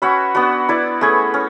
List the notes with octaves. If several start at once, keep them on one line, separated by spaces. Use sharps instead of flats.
C#4 F#4 B4 E5
B3 D4 F#4
E4 B4 D5
A3 C#4 G#4 B4
C#4